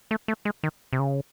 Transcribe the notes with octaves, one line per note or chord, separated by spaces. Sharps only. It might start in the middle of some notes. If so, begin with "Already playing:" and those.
A3
A3
G#3
D#3
C3
C#3